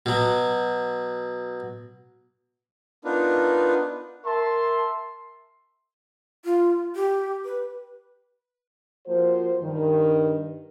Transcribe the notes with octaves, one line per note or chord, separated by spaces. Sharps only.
B2 F#3
B3 D4 D#4 F4 A#4 B4
A#4 E5 A5 C6
F4
G4
B4
F3 A#3 F#4 C5
G2 D#3